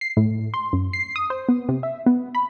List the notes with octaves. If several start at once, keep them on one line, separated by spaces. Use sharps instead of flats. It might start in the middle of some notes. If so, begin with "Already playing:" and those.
C7
A2
C6
F#2
C7
D#6
C5
B3
C3
E5
B3
B5